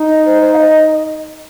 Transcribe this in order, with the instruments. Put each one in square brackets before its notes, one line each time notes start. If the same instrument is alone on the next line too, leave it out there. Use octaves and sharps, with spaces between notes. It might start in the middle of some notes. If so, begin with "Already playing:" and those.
Already playing: [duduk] D#4
[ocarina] D#5
C5
C5
F5
D#5